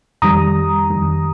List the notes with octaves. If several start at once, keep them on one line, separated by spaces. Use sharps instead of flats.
F2 D#3 G3 A#5 D#6
F2 D#3 G3